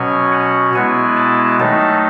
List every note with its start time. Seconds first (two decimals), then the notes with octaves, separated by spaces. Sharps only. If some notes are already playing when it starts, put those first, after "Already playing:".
Already playing: B2 F#3 C#4 G#5
0.32 F#5
0.74 B2 G#3 B3 E4 G#5
1.16 A5
1.59 D#3 F#3 A3 D#4 A5